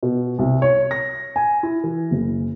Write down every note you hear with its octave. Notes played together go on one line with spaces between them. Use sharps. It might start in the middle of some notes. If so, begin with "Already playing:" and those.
B2
C2
C#5
A#6
G#5
E4
E3
F#1